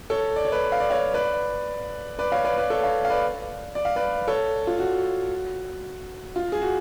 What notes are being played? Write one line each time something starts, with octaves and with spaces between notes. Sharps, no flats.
A4 C#5
D5
C#5
B4 D5
F5
D5
C#5 F5
B4 D5
B4 D5
C#5 F5
B4 D5
B4 D5
A4 C#5
C#5 F5
F5
B4 D5
D5
F5
B4 D5
A4 C#5
F4
F#4
F4
G#4
F#4